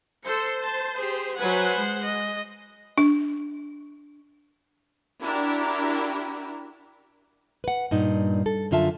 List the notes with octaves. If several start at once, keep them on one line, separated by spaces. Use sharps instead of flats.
A4 C5 C#7
A5
G4 G#4
F#3 B4 C5 F#5 G#5
G#3
D#5
D4
D4 E4 F#4 G4 A#4
B4 F#5
G2 A#2 D#4
A4
F#2 D3 F4 E5 A5